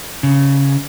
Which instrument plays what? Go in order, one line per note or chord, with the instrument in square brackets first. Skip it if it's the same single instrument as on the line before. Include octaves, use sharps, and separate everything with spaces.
[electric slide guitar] C#3